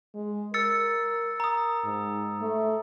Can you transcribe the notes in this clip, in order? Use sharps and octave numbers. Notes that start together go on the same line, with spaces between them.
G#3
A#4 E6 A6 C#7
A#5 D#6
G#2
A3